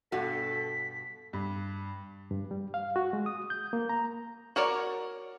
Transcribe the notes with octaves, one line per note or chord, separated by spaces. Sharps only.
G2 B2 F#4 A4 B6
G2
G2
G3
F5
F#4
G#3
D#6
G6
A#3
A#5
F#4 A#4 C#5 D5